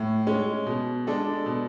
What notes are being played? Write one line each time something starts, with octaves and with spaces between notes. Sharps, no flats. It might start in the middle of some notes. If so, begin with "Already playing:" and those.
Already playing: A2
G#3 C#4
B2
G#3 D4 A4
B2